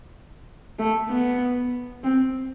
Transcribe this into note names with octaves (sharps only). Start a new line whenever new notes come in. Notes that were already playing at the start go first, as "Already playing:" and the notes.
A3
B3
C4